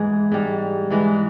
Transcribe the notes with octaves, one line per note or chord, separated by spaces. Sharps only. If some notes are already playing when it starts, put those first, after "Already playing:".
Already playing: G#2 E3 G#3 G#4
G#2 G3
G#2 E3 G#3